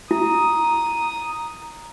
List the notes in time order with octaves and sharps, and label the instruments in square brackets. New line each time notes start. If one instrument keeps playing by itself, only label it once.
[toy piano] E4 [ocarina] A#5 [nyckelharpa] D#6